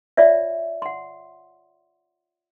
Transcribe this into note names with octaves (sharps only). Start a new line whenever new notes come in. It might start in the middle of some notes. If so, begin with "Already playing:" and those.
F4 C#5 D5 E5
F#5 C6